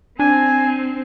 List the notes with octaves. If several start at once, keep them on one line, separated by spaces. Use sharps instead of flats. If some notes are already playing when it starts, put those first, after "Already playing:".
C4 D4 G#5